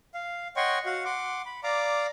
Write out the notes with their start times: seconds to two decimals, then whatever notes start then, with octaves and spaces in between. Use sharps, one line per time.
0.14 F5
0.56 C#5 D#5 F#5 G5 C6 C#6
0.86 F#4 F5 F#5
1.05 F#5 C6 D6
1.46 B5
1.64 D5 F5 A#5 D6